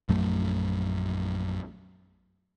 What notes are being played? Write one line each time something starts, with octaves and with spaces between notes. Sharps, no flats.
A#1 F#2 F#3 A3